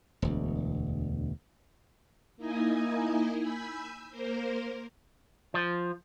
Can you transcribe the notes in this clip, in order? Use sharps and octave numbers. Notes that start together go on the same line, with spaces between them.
E1 D2
A#3 D#4 E4 D#5 G#5
G#5 B5 E6 G6
A#3 A#4 C5
F3